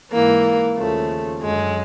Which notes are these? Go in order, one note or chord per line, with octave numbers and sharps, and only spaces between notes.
G#2 E3 A#3
D#2 C#3 F3 A3
F#2 D3 F#3 G#3